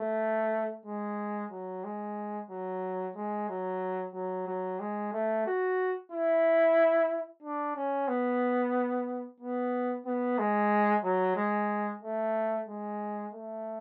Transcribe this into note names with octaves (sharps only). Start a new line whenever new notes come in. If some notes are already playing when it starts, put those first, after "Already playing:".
Already playing: A3
G#3
F#3
G#3
F#3
G#3
F#3
F#3
F#3
G#3
A3
F#4
E4
D4
C#4
B3
B3
B3
G#3
F#3
G#3
A3
G#3
A3